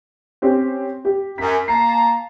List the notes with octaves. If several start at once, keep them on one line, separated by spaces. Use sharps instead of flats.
C4 C#4 G4
G4
F#2 B6
A#3 A5 A#5 C7